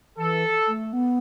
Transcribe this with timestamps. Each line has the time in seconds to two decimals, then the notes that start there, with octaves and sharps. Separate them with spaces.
0.17 E3 A4
0.68 A3
0.93 B3